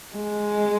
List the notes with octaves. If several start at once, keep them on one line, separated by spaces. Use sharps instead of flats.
G#3